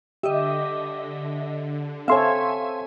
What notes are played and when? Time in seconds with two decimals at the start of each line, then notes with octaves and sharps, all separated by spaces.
0.23 D3 G4 D#5 E5
2.08 C4 A4 C#5 E5 F5 G#5 C6